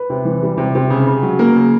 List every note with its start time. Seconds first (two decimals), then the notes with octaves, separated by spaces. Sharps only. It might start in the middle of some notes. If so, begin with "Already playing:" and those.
Already playing: B4
0.10 C3
0.25 E3
0.42 G3
0.58 C3
0.75 C3
0.90 C#3
1.07 C#3
1.23 F#3
1.39 A#3 A#4
1.56 C#3